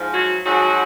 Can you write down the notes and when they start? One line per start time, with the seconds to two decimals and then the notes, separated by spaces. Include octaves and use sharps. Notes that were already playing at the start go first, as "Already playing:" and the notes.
Already playing: G#2 F3
0.14 F#3 F#4
0.45 G#2 F3 F#3 F#4